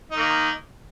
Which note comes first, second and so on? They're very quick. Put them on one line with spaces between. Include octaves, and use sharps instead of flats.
D#4 D#3 A#3